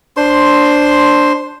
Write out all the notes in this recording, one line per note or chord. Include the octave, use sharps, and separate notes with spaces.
D4 C5 C6